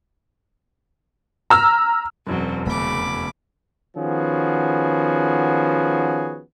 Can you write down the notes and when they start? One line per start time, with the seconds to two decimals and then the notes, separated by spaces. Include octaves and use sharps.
1.50 A#5 E6 F6
2.27 E1 F#2 B2 F#3 C4
2.66 F1 C#3 A3 B3 B5 D6
3.97 D#3 F3 B3 C#4 F#4 G#4